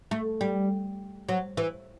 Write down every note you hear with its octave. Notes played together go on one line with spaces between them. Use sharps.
A3
G3
F#3
E3